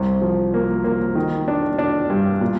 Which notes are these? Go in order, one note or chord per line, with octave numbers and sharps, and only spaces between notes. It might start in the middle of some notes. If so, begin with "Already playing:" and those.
Already playing: C2
F3
A#3
A#3
D#3
D4
D4
G2
A#2